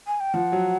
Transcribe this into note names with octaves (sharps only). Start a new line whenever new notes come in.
G#5
G5
F3 F#5
F#3